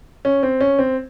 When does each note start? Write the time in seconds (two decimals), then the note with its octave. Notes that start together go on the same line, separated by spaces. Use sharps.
0.25 C#4
0.43 C4
0.61 C#4
0.79 C4